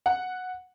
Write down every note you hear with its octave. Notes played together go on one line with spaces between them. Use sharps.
F#5